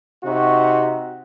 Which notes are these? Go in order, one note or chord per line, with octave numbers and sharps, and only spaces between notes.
C3 D#4 F#4